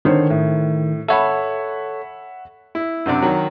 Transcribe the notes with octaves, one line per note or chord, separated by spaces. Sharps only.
D3 D#3 C5 C#5
A2
A4 C#5 E5 F#5 B5
E4
F#2 C3 D4 D5
D#3 F#3